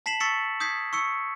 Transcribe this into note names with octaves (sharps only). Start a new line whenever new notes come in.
A5 B6 C7 E7 F#7
C#6 E6 A6 B6 C#7
D#6 G6 G#6 B6 C7
C#6 E6 C#7